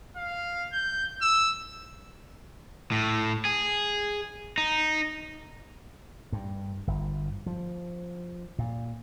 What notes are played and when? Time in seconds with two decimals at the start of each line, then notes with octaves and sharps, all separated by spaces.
0.16 F5
0.73 G6
1.22 E6
2.92 A2
3.45 G#4
4.58 D#4
6.32 G2
6.87 G1
7.46 F3
8.59 A#2